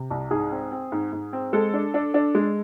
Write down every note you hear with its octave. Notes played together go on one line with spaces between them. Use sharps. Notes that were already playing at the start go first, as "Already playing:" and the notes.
Already playing: C3
C2
G#2 G#4
C4
C4
G#2
G#2
C4
G#3 A4
D4
D4
D4
G#3